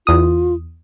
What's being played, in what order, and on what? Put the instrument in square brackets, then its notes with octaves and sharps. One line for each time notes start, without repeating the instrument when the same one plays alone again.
[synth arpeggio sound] E2 D#6 [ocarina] F4